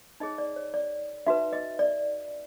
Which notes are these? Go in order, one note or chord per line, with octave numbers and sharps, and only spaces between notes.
D#4 G#4 C#5 D#5
D5
C#5
D5
D#4 F#4 B4 E5
D#5
D5